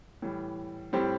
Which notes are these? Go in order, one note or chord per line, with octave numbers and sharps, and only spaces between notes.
A2 E3 G3
A2 G3 C4 G4